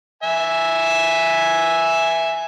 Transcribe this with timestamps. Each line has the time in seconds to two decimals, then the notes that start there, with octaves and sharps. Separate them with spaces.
0.23 E5 G#5